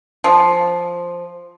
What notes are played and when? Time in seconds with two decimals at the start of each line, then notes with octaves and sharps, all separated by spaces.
0.24 F3